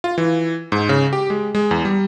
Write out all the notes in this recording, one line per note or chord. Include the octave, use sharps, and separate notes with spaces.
F4
E3
G#2
C#3
G4
G#3
G#3
E2
G3